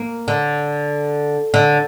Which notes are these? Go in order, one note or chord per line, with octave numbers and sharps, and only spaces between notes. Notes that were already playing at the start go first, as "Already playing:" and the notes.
Already playing: A#3
D3
D3